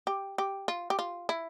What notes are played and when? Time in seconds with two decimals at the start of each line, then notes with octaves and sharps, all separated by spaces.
0.07 G4
0.38 G4
0.68 F4
0.90 G4
0.99 F4
1.29 E4